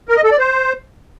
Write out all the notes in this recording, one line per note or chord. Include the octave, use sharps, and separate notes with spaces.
A#4
D#5
A4
D5
C5